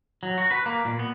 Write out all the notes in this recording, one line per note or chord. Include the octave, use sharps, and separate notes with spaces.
F#3
F#4
B4
A#3
A#2
B3